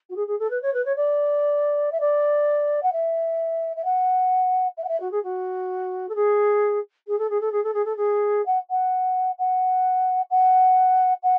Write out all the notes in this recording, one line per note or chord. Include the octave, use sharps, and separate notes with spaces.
F#4
G#4
G#4
A4
B4
C#5
B4
C#5
D5
E5
D5
F#5
E5
E5
F#5
E5
F#5
E5
F#4
G#4
F#4
A4
G#4
G#4
A4
G#4
A4
G#4
A4
G#4
A4
G#4
F#5
F#5
F#5
F#5
F#5